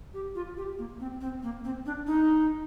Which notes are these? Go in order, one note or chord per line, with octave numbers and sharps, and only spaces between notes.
G4
F4
G4
A#3
C4
C4
A#3
C4
D4
D#4